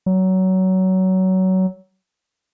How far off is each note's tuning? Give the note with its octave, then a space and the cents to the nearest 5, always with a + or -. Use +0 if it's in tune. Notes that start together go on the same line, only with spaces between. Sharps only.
F#3 +20